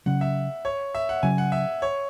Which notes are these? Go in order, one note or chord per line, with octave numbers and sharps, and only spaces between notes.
C#3 F#3 C#4 F#5
E5
C#5
E5
F#5
C#3 F#3 C#4 G#5
F#5
E5
C#5